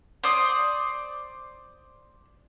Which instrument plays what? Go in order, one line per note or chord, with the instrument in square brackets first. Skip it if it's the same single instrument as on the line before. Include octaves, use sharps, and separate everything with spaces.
[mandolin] C5 D5 D#6